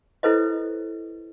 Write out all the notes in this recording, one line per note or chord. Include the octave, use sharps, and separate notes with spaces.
E4 A4 B4 C5 D#5